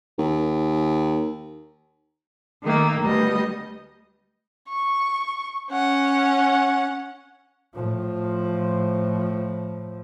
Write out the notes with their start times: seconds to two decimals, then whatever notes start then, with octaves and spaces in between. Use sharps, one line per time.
0.18 D#2
2.63 D#3 A3 A#3
3.03 D2 G3 B3 D#5
4.70 C#6
5.71 C#4 F#5
7.75 A2 F3